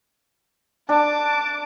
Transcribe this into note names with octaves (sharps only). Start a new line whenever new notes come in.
D4 A5 D6